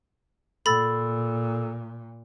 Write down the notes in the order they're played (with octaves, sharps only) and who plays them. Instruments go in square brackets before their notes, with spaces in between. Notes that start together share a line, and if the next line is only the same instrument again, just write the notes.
[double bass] A#2 [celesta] A4 E6 [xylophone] B5 A6